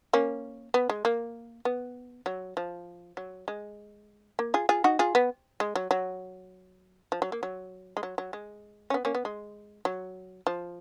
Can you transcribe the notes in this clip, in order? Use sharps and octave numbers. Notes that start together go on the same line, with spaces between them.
A#3 C#4
B3
G#3
A#3
B3
F#3
F3
F#3
G#3
A#3
F4 G#4
F4 G#4
D#4 F#4
F4 G#4
B3
G#3
F#3
F#3
F3
F#3
A#3
F#3
G#3
F#3
F#3
G#3
C#4
B3
A#3 C#4
B3
G#3
F#3
F3